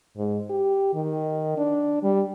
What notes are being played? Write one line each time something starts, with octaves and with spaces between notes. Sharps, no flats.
G#2
G4
D#3
D4
G3